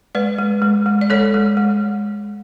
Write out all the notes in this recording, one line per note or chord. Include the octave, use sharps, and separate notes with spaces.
G#3 B4 D5
G#3
G#3
G#3
D5
G#3 A4 C#5
G#3
G#3